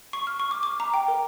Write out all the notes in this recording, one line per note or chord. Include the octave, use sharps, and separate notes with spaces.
C#6
F6
C#6
D6
D6
A#5
G5
A#4